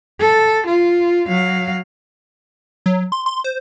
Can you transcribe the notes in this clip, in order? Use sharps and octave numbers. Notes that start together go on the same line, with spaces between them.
A4
F4
F#3 F5
F#3
C6
C6
C5